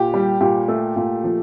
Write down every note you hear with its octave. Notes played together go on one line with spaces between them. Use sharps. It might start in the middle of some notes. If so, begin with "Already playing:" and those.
Already playing: A#2 G4
G3
A#2 G4
A3
A#2
F3